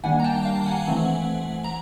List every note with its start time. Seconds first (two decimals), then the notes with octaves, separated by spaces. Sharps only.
0.04 D#3 G3 A#3 D4 F#5 G#5
0.20 A#5
0.24 G5 A5
0.45 F5 G5
0.66 F#5 G#5
0.87 E3 A3 C4
1.64 A#5